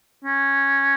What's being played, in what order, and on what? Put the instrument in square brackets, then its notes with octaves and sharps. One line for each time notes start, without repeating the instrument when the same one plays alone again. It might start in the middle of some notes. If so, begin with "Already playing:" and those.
[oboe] C#4